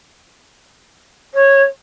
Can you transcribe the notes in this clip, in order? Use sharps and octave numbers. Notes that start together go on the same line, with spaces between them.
C#5